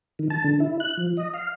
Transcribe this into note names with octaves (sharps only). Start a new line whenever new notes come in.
D#3
A5
D3
E4
F#6
F3
D#5
F5